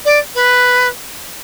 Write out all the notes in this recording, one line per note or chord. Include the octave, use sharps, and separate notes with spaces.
D5
B4